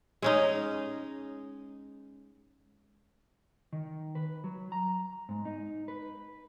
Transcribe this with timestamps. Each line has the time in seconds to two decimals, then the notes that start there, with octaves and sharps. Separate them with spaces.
0.22 G#3 C#4 D#4
3.73 D#3
4.15 B4
4.44 F#3
4.72 A#5
5.29 G#2
5.45 D#4
5.88 B4